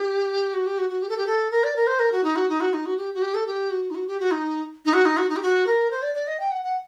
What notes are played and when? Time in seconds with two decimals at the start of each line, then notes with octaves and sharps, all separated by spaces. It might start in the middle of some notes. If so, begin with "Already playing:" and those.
Already playing: G4
0.54 F#4
0.66 G4
0.78 F#4
0.89 F#4
1.02 G4
1.09 A4
1.17 G4
1.27 A4
1.51 A#4
1.64 D5
1.76 A#4
1.87 C5
1.99 A#4
2.12 F#4
2.24 D#4
2.36 F#4
2.49 D#4
2.60 F#4
2.73 D#4
2.86 F#4
2.97 G4
3.14 F#4
3.22 G4
3.35 A4
3.47 G4
3.70 F#4
3.90 D#4
3.95 F#4
4.08 G4
4.20 F#4
4.31 D#4
4.85 D#4
4.93 F#4
5.05 D#4
5.17 F#4
5.29 D#4
5.36 G4
5.42 F#4
5.67 A#4
5.91 C5
6.02 D5
6.14 D5
6.27 D#5
6.40 G5
6.51 F#5
6.63 F#5